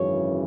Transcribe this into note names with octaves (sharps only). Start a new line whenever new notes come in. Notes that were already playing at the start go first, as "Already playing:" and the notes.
Already playing: G#1 F#2 C#3 E3 C#5